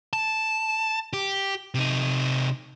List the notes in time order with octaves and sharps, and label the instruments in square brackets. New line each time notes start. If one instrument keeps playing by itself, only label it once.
[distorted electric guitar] A5
G4
C3 D#4